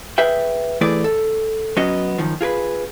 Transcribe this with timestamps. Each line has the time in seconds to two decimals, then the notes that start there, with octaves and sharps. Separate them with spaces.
0.18 G#4 B4 E5 G5
0.81 E3 A3 E4 G#4 B4 D5
1.04 A4
1.77 F#3 B3 C#4 F#4 D#5
2.18 F#2 D#3 F3
2.41 F4 G#4 A#4 B4